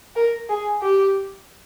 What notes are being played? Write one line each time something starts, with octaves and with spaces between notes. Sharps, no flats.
A#4
G#4
G4